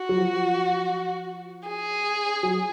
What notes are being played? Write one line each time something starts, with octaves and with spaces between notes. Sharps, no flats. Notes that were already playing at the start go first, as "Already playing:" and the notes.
Already playing: F#4
F#3
F3
G#4
F#3